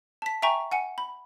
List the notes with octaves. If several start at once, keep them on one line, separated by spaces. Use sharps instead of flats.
A5 B6
E5 G5 G#5 A#5 C#6
F#5 G#5 C#7
B5